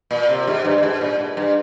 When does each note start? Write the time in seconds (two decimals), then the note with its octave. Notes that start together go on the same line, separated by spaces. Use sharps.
0.11 A#2
0.29 C3
0.47 G#2
0.65 G2
0.78 G2
0.83 G#2
1.01 A#2
1.19 G#2
1.37 G2